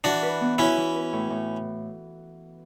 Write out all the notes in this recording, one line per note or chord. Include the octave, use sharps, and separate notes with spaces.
E3 D4 F#4
B4
B3
C#4 E4 F#4
E3
B4
A2
A2